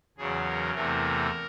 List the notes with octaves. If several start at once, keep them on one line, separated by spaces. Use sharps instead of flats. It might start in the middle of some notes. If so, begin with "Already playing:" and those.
E2 C#3 F#3 G#4
A#4
E2 C3 E3 A3 A#4